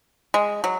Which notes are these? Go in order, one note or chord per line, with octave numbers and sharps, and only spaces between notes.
G#3
F#3